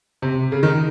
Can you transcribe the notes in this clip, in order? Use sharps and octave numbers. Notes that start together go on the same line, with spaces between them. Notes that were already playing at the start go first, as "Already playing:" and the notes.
C3
C#3
D#3